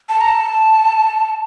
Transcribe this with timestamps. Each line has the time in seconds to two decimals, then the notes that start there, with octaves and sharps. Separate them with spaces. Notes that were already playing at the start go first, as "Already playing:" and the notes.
0.09 A5
0.21 A#5
0.28 A5